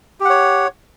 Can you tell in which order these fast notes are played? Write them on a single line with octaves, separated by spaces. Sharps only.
G4 F#5 C#5